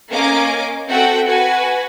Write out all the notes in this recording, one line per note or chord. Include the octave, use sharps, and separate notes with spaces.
A#3 C#4 D#5 G#5 D6
C4 F#4 A4 E5 F#5 G5
F#4 B4 G#5